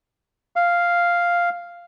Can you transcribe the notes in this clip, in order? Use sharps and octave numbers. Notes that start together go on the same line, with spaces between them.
F5